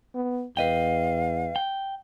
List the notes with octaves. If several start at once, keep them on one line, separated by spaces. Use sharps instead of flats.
B3
E2 B4 D#5 F5 G5
G5